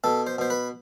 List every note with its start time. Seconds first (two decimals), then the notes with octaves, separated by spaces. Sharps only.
0.04 B2 A4
0.27 C5
0.38 B2 C5
0.50 B4